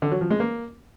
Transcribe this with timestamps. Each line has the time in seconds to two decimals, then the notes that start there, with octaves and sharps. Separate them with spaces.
0.02 D3
0.12 F#3
0.21 F3
0.30 G#3
0.40 A#3